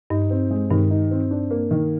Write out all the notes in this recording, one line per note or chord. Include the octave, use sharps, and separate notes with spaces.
G2 D#4
C4
G#3
G2 D#3
D#4
C4
D4
A#3
D#3